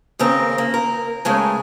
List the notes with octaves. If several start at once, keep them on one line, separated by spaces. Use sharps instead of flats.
D#2 C#3 C4 A#4
A#3
A#4
C#3 G#3 A3 G#5